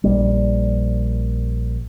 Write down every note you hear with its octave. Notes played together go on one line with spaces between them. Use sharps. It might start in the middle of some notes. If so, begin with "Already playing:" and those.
A#1 G3